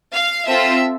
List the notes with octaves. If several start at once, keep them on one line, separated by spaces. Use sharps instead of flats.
F5
C4 F4 A4 E5